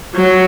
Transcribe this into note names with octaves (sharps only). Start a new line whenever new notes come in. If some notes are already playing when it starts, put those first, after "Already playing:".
F#3